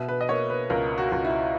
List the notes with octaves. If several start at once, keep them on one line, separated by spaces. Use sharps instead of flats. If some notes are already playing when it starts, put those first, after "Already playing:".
Already playing: B2 E5
B4
D#5
A#3 C#5
B4
C#2 A#4
F#4
C#2
E4